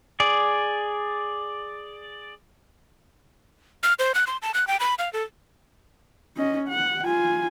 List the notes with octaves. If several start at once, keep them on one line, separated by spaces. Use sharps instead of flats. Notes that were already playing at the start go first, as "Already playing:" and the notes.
G#4 D5
F6
C5
F#6
C6
A5
F#6
G5
B5
F5
A4
C#4 D#5
F#5
F4 G#5